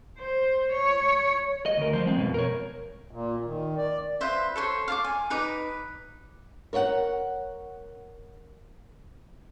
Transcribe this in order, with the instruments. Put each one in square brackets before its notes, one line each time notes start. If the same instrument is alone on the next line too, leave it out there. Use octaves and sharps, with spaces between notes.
[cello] C5
C#5
[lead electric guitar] D#5
D2 A#4
F3 C5
G#3 C4
F2 B2
A#4 C#5
[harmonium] A#2
D#3
D5
[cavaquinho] F4 B4 C5 E5
A4 C5 C#5 C6
F5 A5 C6 D6
G#5
D#4 B4 A#5 D6
[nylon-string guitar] A#4 C#5 D#5 F#5